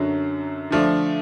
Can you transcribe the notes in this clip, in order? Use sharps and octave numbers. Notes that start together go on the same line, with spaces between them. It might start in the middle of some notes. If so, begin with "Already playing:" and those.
Already playing: F#2 D3 F#3
D3 F3 A3 D4